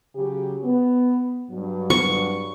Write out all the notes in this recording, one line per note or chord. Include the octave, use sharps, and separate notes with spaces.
C#3 F#3 G4
B3
G2 F#3
C#6